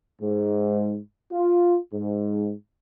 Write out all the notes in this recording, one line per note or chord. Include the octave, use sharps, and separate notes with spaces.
G#2
F4
G#2